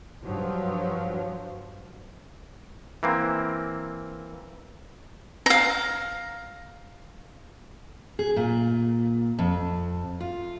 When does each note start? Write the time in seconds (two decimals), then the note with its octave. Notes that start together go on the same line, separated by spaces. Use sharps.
0.23 G2 F3 F#3
3.03 E3 A#3 C4
5.46 F5 A#5
8.19 G#4
8.36 A#2
9.39 F2
10.20 F4